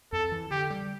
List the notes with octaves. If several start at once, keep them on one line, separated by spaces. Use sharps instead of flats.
F2 A4
E3
D3 G4
G3